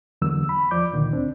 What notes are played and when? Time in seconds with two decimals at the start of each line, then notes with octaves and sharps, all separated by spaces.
0.22 E2 D3 F#3 A#3 E6
0.49 B5
0.71 E2 F3 D5 D6 G6
0.93 C#2 A#2 D3 D#3
1.12 D2 C4 D4